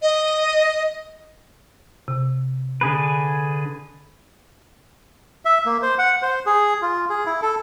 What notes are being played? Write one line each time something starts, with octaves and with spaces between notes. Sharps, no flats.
D#5
C3
D3 G#4 B4
E5
A#3
C5
F#5
C5
G#4
F4
G#4
E4
A4